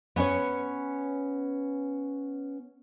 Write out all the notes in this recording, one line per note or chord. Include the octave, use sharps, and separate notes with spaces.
B3 C#4 B4 C#5